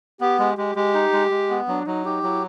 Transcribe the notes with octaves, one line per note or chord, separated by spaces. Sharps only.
B3 G4
G#3 G4
G#3 G4
G#3 G4
D#4
G#3
G#3
B3
F#3 D4
F#3 D#4
D#4 G4
F#3 E4